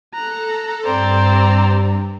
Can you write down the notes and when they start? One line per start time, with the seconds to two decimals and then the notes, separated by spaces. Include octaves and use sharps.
0.14 A4 A#5 F#6
0.85 G2 C4 C5 D5 A#5